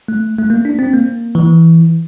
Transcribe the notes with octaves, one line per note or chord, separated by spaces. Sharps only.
A3
A3
A#3
D4
C4
A#3
E3